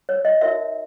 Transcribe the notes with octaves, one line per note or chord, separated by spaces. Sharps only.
C#5
D#5
D#4 F#4 A#4 C#5 E5